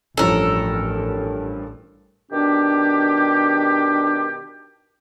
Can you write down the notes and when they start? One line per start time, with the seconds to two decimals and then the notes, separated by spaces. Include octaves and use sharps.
0.17 A1 G2 F3 C#4 A4 A#4
2.31 B2 D#3 D4 G4